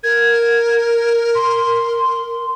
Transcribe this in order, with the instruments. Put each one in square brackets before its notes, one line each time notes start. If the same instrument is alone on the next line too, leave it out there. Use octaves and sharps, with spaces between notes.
[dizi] A#4 [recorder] G#6
[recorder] C6